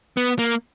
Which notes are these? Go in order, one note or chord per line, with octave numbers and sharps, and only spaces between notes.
B3
A#3